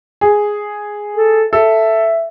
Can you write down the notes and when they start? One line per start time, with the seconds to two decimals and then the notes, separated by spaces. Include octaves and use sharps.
0.21 G#4
1.16 A4
1.53 A4 E5